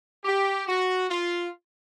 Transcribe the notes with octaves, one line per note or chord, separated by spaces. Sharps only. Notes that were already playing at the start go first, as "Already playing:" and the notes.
G4
F#4
F4